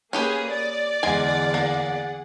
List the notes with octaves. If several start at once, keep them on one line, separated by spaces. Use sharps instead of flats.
A#3 C#4 G4 G#4 B4 D#6
D5
E2 D3 G#3 G#4 F#5 G#5
A#3